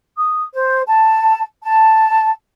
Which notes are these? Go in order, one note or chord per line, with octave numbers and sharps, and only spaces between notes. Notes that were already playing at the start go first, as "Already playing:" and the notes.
D#6
C5
A5
A5